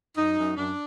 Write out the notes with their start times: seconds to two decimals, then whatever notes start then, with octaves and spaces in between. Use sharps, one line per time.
0.17 F#2 D#4
0.38 F#2
0.57 F#2 D4